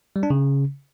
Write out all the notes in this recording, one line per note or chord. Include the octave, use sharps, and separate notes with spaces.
G3
D4
C#3